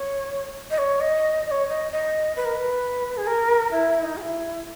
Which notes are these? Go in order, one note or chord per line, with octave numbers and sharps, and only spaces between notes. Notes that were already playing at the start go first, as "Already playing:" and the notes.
Already playing: C#5
D#5
C#5
D#5
D#5
C#5
D#5
D#5
B4
A#4
B4
G#4
A#4
E4
D#4
G#4
E4